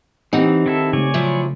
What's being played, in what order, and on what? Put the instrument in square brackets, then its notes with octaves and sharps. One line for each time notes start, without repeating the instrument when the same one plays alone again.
[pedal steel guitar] E3 [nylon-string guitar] C4 G4 F#5 [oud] D#4
[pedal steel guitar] D#3 E4 A4
[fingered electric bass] C#3 A3 [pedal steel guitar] C#5 D5 G#5
[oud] F3 F#3 E4